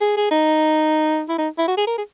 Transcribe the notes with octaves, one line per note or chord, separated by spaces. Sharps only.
G#4
G#4
D#4
E4
D#4
E4
F#4
G#4
A#4
G#4